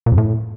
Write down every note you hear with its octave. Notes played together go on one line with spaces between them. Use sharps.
A#2
F2
A2